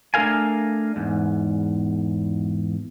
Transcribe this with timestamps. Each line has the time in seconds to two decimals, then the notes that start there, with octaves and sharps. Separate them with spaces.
0.14 A3 D4 A4 A#4 F5 G#5
0.96 E2 G#2